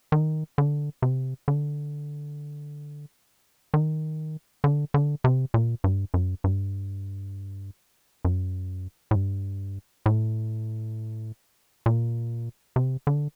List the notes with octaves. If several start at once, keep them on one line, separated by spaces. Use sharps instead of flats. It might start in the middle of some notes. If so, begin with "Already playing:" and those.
D#3
D3
C3
D3
D#3
D3
D3
C3
A#2
G2
F#2
G2
F#2
A2
G2
A2
A#2
C3
D3